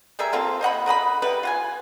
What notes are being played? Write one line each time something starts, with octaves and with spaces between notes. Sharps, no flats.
G3 G#4 A#4 E5
A#3 C4 F4 A4
C5 D#5 F#5 B5
A#4 D#5 F#5 B5
G3 E4 B4
F4 F#5 G#5